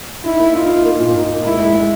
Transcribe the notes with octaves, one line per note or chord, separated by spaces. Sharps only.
D#4 E4
A#3
D#4 F4
A#3
A#3 F4
A#2
A#2 D#4
A#3
G#3 E4
G#3
G#3